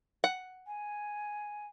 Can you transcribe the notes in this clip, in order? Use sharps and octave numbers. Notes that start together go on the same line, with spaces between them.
F#5
G#5